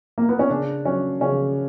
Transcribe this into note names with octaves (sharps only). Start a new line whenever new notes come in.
A#3
B3
C#4
C#3 D4
F#3 C#4
C#3 C#4